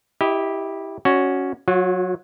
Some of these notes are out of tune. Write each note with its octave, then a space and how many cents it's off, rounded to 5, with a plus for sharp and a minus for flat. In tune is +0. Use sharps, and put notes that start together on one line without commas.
E4 -15 G4 +0 D#5 +15
C#4 +0 F#4 +0 D5 +35
F#3 -10 F4 +45